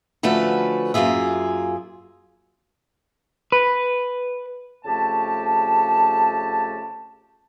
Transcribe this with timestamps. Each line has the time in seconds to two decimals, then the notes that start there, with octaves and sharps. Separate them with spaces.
0.23 D3 F3 A3 C#4 F#4 B4
0.94 F#2 A#3 F4 G#4 E5
3.52 B4
4.84 F2 C#3 A3 G4 A5